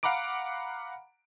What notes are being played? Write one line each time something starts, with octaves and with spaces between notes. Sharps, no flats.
F5 F#5 A#5 B5 D6 D7